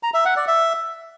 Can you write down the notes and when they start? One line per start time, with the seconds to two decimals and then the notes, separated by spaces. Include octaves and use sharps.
0.03 A#5
0.14 E5
0.25 F#5
0.36 D5
0.47 E5